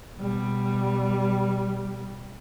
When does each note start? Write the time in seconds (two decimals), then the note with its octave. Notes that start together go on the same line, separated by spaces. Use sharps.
0.17 B2 G3